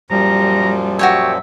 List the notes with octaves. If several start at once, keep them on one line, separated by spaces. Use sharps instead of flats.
F#2 A#2 F3 G3 A#5
F#4 G4 C#5 E5